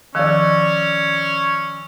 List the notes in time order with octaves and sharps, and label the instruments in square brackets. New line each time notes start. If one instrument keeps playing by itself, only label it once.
[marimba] D#3 F3 [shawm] C#4 [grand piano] D5 E6